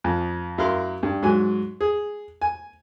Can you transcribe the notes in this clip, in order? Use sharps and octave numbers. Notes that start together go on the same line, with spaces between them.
F2
F#2 E4 A#4 F5 C6
G2
G#2 F#3 G#5
G#4
G#5